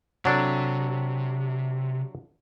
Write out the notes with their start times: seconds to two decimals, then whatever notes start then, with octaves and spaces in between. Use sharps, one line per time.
0.25 C3 F#3 D4 A4